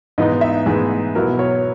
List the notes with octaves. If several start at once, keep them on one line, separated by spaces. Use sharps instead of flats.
G#2 E3 B3 D#4 D#5
E5
G#2 E3 B3 D#4 G#4
B2 F#3 B3 E4 A#4
C#5